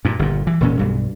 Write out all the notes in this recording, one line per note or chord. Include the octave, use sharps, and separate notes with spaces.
G2 A#2
G1 A#2
E3
E1 A#2 C#4
B1 G2